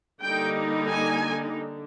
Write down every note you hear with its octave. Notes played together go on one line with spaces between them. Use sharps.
D3 G3 A#3 D#4 G5
G#5
D3